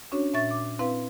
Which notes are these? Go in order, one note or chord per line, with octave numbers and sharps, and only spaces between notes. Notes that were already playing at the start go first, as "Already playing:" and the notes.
C#4 D4 F#4 C#5
A#2 E5 C#6 A6
D6
C4 E4 B4 F5